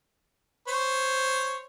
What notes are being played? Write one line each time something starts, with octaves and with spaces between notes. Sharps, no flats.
C5 C#5